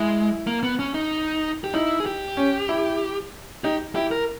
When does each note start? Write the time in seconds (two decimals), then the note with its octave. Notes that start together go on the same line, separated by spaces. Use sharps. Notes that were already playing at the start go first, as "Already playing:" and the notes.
Already playing: G#3 E4
0.47 A#3
0.63 B3
0.79 C#4
0.94 D#4
1.64 G4
1.74 D#4 E4
2.00 G#4
2.06 G4
2.37 C#4
2.69 E4
3.64 D#4 G4
3.95 E4 G4
4.11 A#4